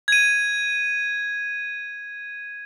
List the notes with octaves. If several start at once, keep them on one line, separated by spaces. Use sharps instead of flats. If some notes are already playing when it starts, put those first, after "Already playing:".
G#6 D#7